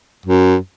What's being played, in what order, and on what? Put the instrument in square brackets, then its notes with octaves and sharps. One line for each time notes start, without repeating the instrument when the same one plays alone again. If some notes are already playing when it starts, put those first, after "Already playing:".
[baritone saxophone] F#2